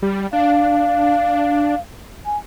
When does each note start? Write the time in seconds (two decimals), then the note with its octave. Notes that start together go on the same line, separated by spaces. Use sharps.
0.02 G3
0.33 D4 F5
2.26 G#5